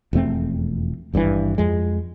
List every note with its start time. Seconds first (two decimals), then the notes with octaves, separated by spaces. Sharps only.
0.13 E1 F2 A3 C4
1.13 G#1 G2 B2 E3
1.58 F2 G#3